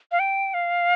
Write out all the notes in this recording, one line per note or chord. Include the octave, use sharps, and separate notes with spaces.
F5
G5
F5